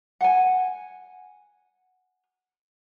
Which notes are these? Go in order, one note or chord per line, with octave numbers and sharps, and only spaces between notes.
F#5 G#5